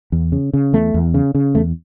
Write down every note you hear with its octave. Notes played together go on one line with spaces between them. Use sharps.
E2
C#3
C#3
E2 A3
E2
C#3
C#3
E2 A3